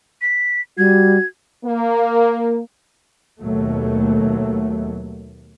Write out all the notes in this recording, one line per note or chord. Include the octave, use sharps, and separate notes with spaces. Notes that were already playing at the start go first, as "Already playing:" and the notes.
B6
G3 F#4 G#6
A#3
D#2 B2 F#3 A3